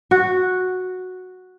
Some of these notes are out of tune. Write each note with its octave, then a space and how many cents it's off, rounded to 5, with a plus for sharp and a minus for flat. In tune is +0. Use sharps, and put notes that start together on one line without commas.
F#4 -5